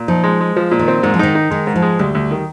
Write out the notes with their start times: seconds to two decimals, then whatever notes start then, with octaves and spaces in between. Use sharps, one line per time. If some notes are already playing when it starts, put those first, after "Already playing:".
Already playing: A#2
0.08 F3 D#4
0.24 G#3
0.41 G#3
0.56 F3
0.71 A#2
0.79 D#3
0.88 C4
1.03 G#2 D#3
1.14 F3
1.19 D#3 D#4
1.35 D#4
1.51 D#3 G#3
1.67 G#2
1.76 F3
1.82 G#3
1.99 D2 G3
2.15 D2
2.31 D#3